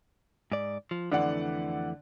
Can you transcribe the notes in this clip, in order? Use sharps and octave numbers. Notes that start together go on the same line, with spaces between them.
G#2 D5
F3
F2 D3 E3 A3 D5 F#5